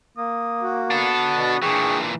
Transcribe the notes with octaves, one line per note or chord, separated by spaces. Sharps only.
A#3 D#6
F#4
B3 D4 A4
B2
A#2 E3 D4 G#4 G5 C#6